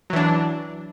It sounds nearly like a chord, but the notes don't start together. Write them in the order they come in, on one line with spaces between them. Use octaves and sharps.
F#3 E3 D4